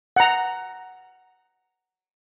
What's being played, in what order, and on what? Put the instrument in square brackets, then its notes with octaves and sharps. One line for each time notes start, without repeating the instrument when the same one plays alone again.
[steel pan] F#5 A#5